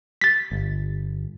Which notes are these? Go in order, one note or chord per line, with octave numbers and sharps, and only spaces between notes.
A6 B6
G1